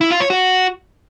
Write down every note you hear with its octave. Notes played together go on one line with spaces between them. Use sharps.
E4
F4
C#5
F#4